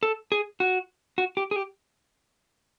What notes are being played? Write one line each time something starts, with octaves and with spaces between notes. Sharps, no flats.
A4
G#4
F#4
F#4
G4
G#4
G4